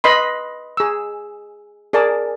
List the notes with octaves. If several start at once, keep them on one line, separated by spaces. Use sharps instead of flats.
B4 D#5 B5 C6
G#4 E6
G#4 A#4 D5 A5